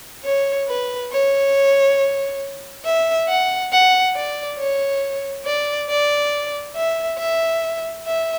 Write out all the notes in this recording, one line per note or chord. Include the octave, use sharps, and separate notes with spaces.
C#5
B4
C#5
E5
F#5
F#5
D5
C#5
D5
D5
E5
E5
E5